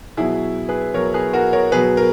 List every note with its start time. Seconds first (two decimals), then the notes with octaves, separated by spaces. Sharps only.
0.17 B2 F#3 E4 G#4
0.69 G#4 B4
0.94 B2 F#3 A#4 C#5
1.14 G#4 B4
1.33 F#4 A#4
1.53 A#4 C#5
1.72 B2 F#3 G#4 B4
1.97 A#4